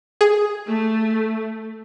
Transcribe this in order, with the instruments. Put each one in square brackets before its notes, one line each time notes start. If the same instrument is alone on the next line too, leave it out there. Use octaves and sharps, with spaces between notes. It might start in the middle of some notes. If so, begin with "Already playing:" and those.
[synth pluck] G#4
[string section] A3